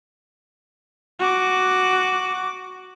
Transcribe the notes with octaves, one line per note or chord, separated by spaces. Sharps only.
F#4 D6